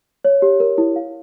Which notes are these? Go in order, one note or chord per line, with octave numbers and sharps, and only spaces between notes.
C#5
G4
A#4
E4
F5